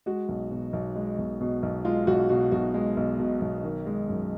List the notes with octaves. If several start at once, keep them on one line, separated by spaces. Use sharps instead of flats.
G#3 F#4
B1
B2
B1
G#3
B1
B2
B1
G#3 F4
B1 F#4
B2 F#4
B1 F#4
G#3
B1
B2
B1
D#3
G#3
F#2